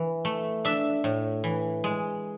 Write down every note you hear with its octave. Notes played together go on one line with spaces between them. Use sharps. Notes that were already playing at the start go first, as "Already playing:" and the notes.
Already playing: E3
A3
D4 E5
A2
E3
G#3